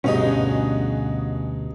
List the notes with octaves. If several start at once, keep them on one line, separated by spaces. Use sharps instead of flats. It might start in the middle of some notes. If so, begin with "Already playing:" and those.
D2 G2 B2 C#4 D#4 F#4 G#4 D#5